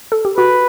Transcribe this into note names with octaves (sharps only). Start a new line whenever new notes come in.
A4
G4
F#4 B4